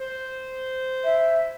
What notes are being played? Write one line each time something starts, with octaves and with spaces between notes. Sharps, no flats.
C5
E5